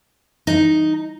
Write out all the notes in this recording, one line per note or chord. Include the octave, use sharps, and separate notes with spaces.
D#4